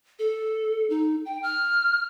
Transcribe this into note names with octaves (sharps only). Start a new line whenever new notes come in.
A4
D#4
G5
F6